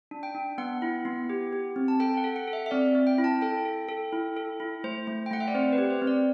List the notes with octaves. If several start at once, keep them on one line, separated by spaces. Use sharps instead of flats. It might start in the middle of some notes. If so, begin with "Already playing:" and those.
D4
G5
D4
B3 F#5
E4
B3
G4
G4
C4
A5
A4 G5
F#5
A4
F#5
A4
E5
E5
C4 D5
C4
G5
E4
A5
A4 G5
A4
A4
E4
A4
E4
A3 C5
A3
G5
A3 F#5
E5
D5
C4 C5
B4
G4
C5
C4
D5